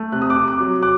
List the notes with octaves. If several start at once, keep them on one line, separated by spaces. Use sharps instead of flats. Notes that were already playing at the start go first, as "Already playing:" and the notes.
Already playing: A3
C3 F#6
D#6
D6 F#6
C3
D6 F#6
F#3
D6 F#6